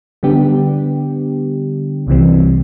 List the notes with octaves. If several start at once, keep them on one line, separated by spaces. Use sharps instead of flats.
D3 G3 B3 D4 G4
C2 C3 E3 G3 C4